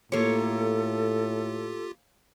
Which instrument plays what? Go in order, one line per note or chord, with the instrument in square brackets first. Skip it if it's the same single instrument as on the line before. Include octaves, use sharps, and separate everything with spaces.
[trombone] A2 [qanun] A#3 C#5 [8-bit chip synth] F4 G4 [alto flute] A4